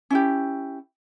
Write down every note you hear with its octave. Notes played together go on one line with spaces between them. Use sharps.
C#4 E4 G4